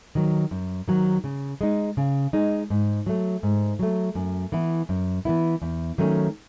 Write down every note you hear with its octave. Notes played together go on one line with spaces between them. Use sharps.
D#3 F#3
F#2
D#3 F#3
C#3
G#3 D#4
C#3
G#3 D#4
G#2
F#3 A3
G#2
F#3 A3
F#2
E3 B3 E4
F#2
E3 B3 E4
E2
D#3 F#3 A3 C#4